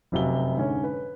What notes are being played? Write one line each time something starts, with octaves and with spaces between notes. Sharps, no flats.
F1 F#2 C3 F#4 F5 G7
G#2 D3 C#4
B4